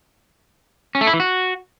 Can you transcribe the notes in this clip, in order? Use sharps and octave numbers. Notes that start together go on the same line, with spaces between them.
C#4
A3
E4
E3
F#4